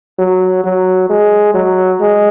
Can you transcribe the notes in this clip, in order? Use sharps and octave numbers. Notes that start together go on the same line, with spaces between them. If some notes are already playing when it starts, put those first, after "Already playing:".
F#3
F#3
G#3
F#3
G#3